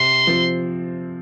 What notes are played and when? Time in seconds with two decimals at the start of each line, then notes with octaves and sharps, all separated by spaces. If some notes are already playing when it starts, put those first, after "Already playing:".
Already playing: C3 C6
0.27 F3 C4